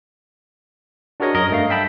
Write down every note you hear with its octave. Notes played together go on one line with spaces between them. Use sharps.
D4 F#4 G#4 A#4 C#5 D#5
F#2 A#4 D#5
G2 A3 F5
E5 G5 A5 B5 E6